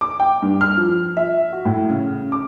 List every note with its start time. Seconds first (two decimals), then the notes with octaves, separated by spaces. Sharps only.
0.01 D6
0.20 G5
0.42 G2
0.61 F6
0.77 F3
1.17 E5
1.52 F#4
1.65 A2
1.90 C#3
2.32 D6